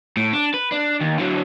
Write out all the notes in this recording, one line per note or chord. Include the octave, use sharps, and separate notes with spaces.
A2
D4
B4
D4
D#2
D3 F#3